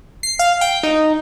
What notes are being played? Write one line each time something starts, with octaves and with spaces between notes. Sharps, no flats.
C7
F5
G5
D#4